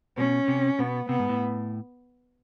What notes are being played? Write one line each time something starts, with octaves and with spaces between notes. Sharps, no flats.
B2 C#4
C3
B2 B3
C3 B3
G#2
A2